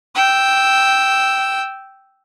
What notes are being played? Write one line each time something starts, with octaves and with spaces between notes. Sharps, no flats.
G5 E6